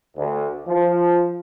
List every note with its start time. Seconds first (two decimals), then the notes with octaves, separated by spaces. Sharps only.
0.17 D2
0.67 F3